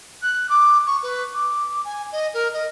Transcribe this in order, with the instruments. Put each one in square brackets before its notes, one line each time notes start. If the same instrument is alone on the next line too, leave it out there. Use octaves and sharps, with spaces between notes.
[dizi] F#6
D6
C#6
B4
D6
G#5
D#5
A#4
D#5